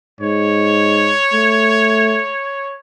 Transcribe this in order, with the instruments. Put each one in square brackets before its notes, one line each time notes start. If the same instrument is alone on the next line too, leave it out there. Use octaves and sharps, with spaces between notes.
[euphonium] G#2 [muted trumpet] C#5
[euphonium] A3